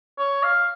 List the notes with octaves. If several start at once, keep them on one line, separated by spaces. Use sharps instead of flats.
C#5
F5